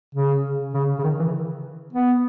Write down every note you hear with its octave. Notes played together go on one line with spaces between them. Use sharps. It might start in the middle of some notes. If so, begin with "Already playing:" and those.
C#3
C#3
C#3
D#3
E3
B3